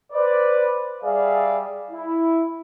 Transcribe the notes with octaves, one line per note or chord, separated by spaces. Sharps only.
B4 C5 D5
G3 G#4 D5 E5 F5
E4